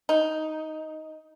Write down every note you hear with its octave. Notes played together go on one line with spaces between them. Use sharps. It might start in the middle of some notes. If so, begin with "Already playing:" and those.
D#4